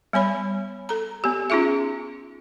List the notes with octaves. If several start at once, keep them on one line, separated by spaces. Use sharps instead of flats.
G3 B3 C#5 B5
A4 A#5
B3 G4
C#4 D#4 F4 G#4 E5